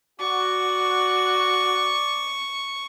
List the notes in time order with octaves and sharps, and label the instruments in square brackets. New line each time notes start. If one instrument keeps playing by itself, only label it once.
[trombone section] F#4 [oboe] D5 [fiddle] C#6